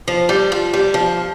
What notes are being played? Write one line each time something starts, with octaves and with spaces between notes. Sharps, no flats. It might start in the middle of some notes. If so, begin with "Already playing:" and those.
F3
G3
F3
G3
F3